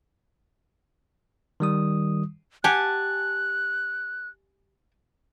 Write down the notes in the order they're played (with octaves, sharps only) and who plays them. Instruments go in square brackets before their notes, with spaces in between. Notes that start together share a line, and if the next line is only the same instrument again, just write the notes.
[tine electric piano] D#3 G3 D#6
[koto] G4 F#5 [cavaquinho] G#5 A5 [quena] F#6